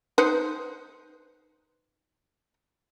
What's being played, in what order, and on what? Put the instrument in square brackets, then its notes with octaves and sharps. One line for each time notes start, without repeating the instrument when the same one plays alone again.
[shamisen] D#4 B4 C5